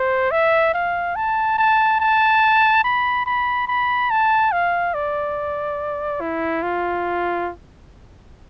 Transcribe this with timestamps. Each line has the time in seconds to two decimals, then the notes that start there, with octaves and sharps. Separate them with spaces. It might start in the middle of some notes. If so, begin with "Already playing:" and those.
Already playing: C5
0.31 E5
0.74 F5
1.16 A5
1.58 A5
2.00 A5
2.84 B5
3.26 B5
3.68 B5
4.10 A5
4.52 F5
4.94 D5
6.21 E4
6.63 F4